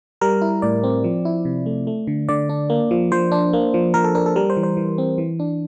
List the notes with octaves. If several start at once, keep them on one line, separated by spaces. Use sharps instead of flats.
G3 A#4
E4
A2 D5
C4
F3
E4
C3
A3
A3
D3
D3 D5
D4
A#3
F3
F3 C5
D4
A#3
F3
F3 A#4
A4
D4 A#4
A4
G3 A#4
C5
E3
C5
E3
C4
E3
D4